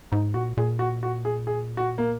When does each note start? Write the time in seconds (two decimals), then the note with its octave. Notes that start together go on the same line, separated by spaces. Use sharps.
0.12 G#2 D#4
0.34 A#2 F#4
0.57 A#2 G#4
0.79 F#4
1.03 F#4
1.25 G#4
1.47 G#4
1.77 F#4
1.98 A#3